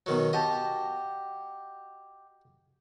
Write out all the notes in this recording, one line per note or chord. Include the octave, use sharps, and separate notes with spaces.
B2 D#3 F#3
F#4 G4 D#5 A5